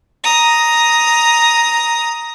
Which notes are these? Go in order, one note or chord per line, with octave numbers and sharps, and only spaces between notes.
A#5 D#6